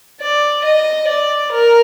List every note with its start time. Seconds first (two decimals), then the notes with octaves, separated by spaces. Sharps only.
0.21 D5
0.64 D#5
1.08 D5
1.51 A#4